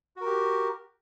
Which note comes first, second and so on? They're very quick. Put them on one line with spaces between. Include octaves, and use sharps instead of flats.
F#4 A#4 G4